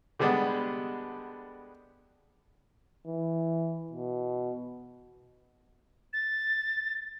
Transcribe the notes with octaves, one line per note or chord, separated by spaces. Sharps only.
D3 G3 G#3 B3 D4
E3
B2
A6